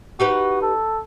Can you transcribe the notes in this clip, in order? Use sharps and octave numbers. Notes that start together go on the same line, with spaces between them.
D#4 F#4 G4 B4
A4